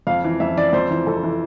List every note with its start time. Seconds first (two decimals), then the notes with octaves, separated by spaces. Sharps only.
0.07 F2 F5
0.24 E3
0.40 F2 E5
0.57 E3 D5
0.73 F2 C5
0.91 E3
1.07 F2 A4
1.18 A4
1.23 E3